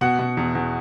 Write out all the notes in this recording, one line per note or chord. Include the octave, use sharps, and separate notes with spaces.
B2 F#5
B2
E2
E2